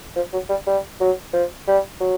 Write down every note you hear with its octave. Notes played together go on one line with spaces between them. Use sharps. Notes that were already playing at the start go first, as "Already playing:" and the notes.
F3
F#3
G3
G3
F#3
F3
G3
F#3